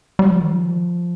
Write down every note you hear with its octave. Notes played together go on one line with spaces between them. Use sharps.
G3
F3
D#3
F3